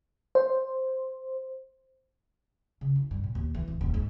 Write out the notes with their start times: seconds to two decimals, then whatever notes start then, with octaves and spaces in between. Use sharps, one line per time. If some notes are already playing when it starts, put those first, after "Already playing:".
0.35 C5
2.81 C#3
2.96 E4
3.11 G2
3.24 A#2
3.35 D#2
3.55 E3
3.68 D1
3.81 D#1
3.94 G#2